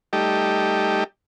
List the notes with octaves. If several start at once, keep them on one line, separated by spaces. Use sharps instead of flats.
G3 A3 D#4 G4